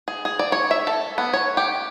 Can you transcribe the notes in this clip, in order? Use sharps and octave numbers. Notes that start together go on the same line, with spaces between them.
G#4
G#4
D5
C#5
E5
A4
B3
C#5
G4